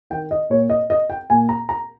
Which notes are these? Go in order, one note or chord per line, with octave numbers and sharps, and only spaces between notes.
D#3 G5
D#5
A#2 C#5
D#5
D#5
G5
A#2 G#5
A#5
A#5